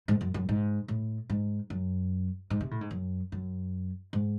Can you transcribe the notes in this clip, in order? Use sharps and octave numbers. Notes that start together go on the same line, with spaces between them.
G#2
F#2
F#2
G#2
A2
G#2
F#2
G#2
C3
A2
G#2
F#2
F#2
G#2